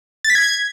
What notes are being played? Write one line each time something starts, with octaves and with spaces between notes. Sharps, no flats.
A6
B6
G#6